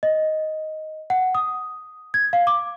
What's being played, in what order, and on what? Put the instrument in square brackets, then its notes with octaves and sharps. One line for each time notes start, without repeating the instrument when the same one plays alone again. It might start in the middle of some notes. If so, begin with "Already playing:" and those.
[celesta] D#5
F#5
D#6
G#6
F5
D6